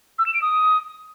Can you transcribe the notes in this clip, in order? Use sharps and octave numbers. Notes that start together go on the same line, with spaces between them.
E6
E7
D7
D#6